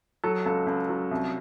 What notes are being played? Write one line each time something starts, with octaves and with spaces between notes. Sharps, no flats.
F#3 A4
C#2 A4
C#2
F#3
C2